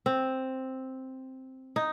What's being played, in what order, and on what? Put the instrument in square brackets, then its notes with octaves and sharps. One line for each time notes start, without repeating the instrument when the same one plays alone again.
[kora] C4
D#4